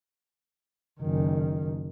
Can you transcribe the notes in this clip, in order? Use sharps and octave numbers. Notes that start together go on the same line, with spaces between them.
F#1 D#3